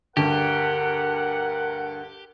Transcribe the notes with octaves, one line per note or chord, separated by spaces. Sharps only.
D2 G2 G4 A#4 F#5